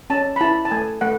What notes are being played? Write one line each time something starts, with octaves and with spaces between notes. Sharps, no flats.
C#4 A5
B5
E4 A5
A5
A3 G#5
A3 F#5